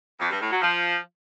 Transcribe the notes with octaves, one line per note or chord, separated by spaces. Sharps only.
F2
G2
A2
F#3
F3